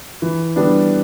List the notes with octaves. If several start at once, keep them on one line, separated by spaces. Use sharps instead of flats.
E3
G3 B3 D4